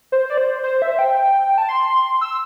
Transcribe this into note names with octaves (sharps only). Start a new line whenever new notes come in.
C5
D5
C5
C5
E5
G5
A5
C6
E6